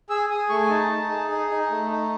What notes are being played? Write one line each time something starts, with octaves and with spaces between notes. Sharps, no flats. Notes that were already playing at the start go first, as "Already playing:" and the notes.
G#4 E6
G#4 D#6
A3 C#6
G#5
D#4 A5
D#4
G#4
D#4
D#4
A3
D#4